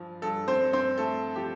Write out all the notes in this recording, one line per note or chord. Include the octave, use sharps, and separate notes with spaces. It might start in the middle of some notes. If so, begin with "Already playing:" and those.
Already playing: G2 F3
G2 A4
C4 C5
G2
C4 C5
A3 A4
F3 G4